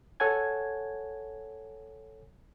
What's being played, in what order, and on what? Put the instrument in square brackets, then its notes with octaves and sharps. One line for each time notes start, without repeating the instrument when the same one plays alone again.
[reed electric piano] A4 C#5 F#5 G#5 G#6